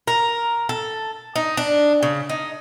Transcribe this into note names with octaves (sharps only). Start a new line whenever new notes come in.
A#4
A4
D#4
D4
C#3
D#4